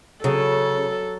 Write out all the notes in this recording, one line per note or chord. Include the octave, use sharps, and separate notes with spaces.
C#3 F#3 A4